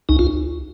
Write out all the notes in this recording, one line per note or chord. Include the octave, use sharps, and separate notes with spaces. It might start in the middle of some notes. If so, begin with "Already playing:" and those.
C#2 D#4
F4